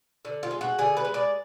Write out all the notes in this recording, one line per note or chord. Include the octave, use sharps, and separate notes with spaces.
D3
F4
G#3
F#4
D3 G#4
B4
G#3
D5